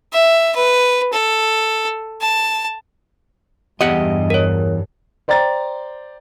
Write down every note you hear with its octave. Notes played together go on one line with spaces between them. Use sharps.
E5
B4
A4
A5
E2 G2 G4 D#5 F#5
A#4 C#5
C5 D5 G5 A#5 A6